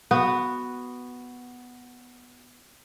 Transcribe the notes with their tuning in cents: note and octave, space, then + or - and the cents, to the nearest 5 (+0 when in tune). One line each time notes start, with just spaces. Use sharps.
B3 +0 F#4 +0